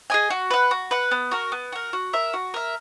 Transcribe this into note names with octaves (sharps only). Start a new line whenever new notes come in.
G#4 D#5 G#5
F#4
B4 F#5
F#4
B4 F#5
B3
F#4 A#4
B3
F#4 A#4
F#4
A#4 E5
F#4
A#4 E5